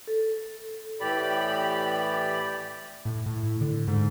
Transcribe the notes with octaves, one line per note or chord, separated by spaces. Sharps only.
A4
A2 E3 G4 D5 B5
A2
A2
D3
G#2